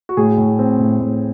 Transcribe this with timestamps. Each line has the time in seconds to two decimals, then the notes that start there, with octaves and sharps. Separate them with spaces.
0.09 F#4
0.17 A2 G#4
0.38 A2
0.59 C4
0.79 A2
1.00 A2